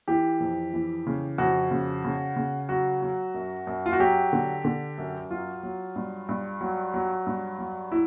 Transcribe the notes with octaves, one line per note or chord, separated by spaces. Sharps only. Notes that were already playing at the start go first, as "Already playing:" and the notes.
E3 G4
F2
E3
C#3
F2 F#4
C#3
C#3
C#3
F#3 F#4
F#3
F#2
F#2
F4
F#4
F#3 G4
D3
D3
F#2
F#3 F4
F#3
G2
G2
F#3
F#3
G2
F#3
E4